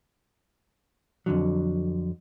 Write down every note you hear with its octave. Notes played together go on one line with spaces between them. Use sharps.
F2 D3 F#3